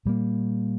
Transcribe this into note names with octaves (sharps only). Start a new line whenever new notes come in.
A#2 G3 A#3